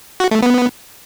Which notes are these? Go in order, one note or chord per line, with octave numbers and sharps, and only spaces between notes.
F#4
A3
B3